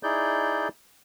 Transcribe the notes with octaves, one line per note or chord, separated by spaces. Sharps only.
D#4 E4 G#4 D5 G6